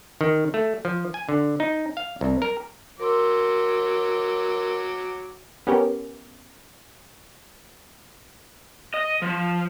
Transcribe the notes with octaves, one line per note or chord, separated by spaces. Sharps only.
D#3
A3
F3
G#5
D3
D#4
F5
C2
A#4
F#3 A#4 C6 D6 E6
B3 C#4 G4 A#4
D#5
F3